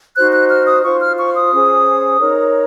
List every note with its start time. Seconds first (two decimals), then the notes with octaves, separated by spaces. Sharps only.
0.16 D#4 F#4 C5 F#6
0.33 F#6
0.51 F6
0.67 D#6
0.84 F4 C5 C#6
1.02 F6
1.19 C#6
1.35 D#6
1.51 C#4 G#4 C5
2.20 D#4 A#4 C#5